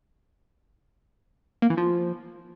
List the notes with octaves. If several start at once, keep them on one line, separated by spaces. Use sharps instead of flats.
A#3
E3
F3